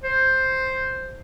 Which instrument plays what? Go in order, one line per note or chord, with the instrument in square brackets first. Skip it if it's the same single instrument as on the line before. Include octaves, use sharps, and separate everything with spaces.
[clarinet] C5